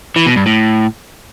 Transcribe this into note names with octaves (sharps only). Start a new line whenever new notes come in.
E3
B2
G2
A2